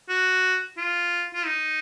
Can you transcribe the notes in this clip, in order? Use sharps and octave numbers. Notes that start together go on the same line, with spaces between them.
F#4
F4
F4
D#4